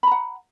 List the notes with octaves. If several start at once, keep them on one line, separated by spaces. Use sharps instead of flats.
F#5 A#5 B5